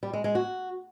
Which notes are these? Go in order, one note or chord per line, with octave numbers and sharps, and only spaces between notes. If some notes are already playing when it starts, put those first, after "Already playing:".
G3
G#3
G#3
F#4